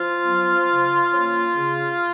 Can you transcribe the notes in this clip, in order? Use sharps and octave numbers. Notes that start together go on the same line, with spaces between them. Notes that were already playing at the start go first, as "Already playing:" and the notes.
Already playing: F3 F4
F#3 B3
C#3
F3 A#3 C#4
C#3